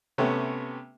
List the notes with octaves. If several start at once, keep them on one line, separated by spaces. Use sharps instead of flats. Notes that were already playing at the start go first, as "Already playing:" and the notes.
C3 A3 B3 C#4 G4